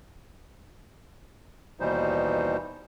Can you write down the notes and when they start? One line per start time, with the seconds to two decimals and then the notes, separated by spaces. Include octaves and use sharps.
1.80 D#2 B2 E3 G3 D#4 C5